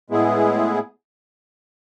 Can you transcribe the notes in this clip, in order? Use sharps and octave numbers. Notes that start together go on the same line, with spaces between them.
A2 G#3 B3 E4 G#4